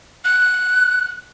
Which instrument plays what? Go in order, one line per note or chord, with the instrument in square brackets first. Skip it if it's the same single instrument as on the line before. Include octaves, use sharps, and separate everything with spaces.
[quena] F#6